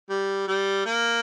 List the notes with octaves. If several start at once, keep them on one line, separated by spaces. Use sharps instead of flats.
G3
G3
A#3